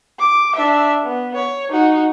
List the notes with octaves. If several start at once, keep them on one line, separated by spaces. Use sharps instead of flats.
D6
D4 E5
B3
C#5
D#4 F#4